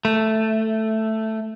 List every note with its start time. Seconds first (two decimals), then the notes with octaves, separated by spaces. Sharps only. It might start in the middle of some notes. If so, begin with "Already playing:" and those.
0.05 A3